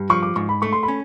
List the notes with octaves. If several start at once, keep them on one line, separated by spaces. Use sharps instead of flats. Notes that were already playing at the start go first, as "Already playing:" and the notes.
Already playing: G2
F3 C#6
D6
G#2 C#6
B5
A3 C#6
C6
B5
C#4